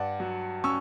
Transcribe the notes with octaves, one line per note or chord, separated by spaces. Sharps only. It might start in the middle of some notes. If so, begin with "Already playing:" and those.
Already playing: G2 D5 F#5
F#3
C#4 C#6 E6